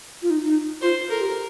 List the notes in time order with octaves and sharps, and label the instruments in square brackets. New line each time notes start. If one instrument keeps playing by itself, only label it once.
[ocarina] F4
D#4
D#4
[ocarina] F4 [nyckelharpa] C5
[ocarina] A4 [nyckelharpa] A#4
[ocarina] G4